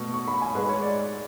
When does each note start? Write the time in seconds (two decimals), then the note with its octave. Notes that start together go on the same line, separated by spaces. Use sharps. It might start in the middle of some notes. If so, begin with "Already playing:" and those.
Already playing: B2 A3 C#6
0.14 C#6
0.28 B5
0.42 G#5
0.55 G#2 G#3 B4
0.68 C#5
0.82 D5